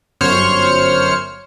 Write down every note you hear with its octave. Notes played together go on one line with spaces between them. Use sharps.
G1 F#2 C5 C#5 F6 C#7